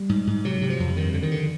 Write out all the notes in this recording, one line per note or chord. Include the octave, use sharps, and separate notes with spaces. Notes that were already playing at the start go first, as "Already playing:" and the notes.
Already playing: G3
G#2
G#2
C3 F#3
C3
F3
F2
G2 D#3
D3
D#3
D3